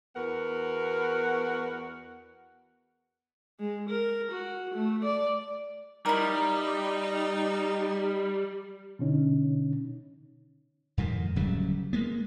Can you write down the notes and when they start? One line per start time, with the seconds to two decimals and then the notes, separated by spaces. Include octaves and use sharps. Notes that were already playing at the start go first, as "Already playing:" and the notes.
0.16 E2 B3 F#4 A#4 F#5
3.60 G#3
3.89 A#4
4.31 F#4
4.74 A3
5.04 D5
6.06 G3 D#4 E4 A#4
8.99 B2 D3 C#4 D#4
10.97 F2 G#2 B2 D#3
11.36 D1 C#3 F#3 G3
11.93 G#3 A#3 B3